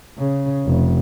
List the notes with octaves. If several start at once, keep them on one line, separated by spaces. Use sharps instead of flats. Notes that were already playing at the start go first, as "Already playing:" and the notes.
C#3
F1